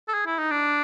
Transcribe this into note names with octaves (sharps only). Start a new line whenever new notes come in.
A4
G#4
E4
D#4
D4